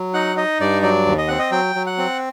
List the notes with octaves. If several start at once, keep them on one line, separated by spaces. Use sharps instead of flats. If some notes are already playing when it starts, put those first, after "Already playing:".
Already playing: F#3
D#4 F#5
D#4 D#5
G2 D5
F#3 D5
D#2
D#5
C4 F#5
D#5
F#3 G5
F#3
F#5
C4